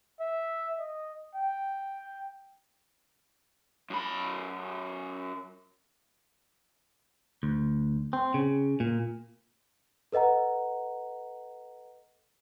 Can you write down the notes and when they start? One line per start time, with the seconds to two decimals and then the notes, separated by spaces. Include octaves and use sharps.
0.20 E5
0.79 D#5
1.35 G5
3.90 F#2 B5
7.43 D2
8.13 C4
8.34 C#3
8.80 A#2
10.12 A4 B4 D#5 F#5 A#5